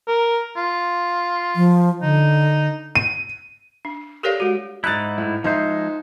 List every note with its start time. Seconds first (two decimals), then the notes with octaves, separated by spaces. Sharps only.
0.08 A#4
0.57 F4
1.56 F3
2.02 D3 D#4
2.95 D#7
3.85 D4
4.23 G4 A4 A#4 C#5 D5 F5
4.40 G#3 F#4
4.84 G#2 D#4 E4 F#6 A6
5.18 A2
5.44 F3 G#3 D#4 C5 E5